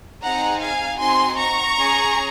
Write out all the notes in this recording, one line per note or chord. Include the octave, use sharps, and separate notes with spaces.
C4 D#4 G#4 F#5 A#5
F5 G#5
C4 D#4 F#4 G#5 C6
A#5 C#6
C#4 G#4